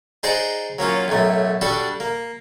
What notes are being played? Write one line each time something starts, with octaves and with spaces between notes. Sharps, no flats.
D#4 G#4 C5 D5 F#5 A#5
F#3 A#3 C#4 F4
B1 F#2 A2 A3
G3 D4 F#4 A4
A#3